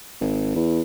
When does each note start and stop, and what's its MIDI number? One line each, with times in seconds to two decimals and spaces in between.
0.21 0.54 32
0.56 0.81 40